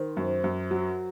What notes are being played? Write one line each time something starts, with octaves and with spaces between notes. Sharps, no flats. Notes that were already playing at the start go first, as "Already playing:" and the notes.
Already playing: D#3 C5
F#2
F#2
F#3